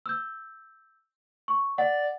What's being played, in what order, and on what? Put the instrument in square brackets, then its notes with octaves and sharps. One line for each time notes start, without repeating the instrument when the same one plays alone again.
[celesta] E6 G6
C#6
[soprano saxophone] D5 [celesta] F#5